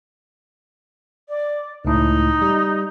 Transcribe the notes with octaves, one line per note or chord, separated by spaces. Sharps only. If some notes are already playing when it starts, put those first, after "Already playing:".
D5
C#2 A2 D#4
G3